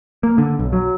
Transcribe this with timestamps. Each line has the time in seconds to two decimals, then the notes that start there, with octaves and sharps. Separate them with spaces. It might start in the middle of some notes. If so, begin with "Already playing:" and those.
0.23 A#3
0.38 D3
0.59 B1
0.73 F#3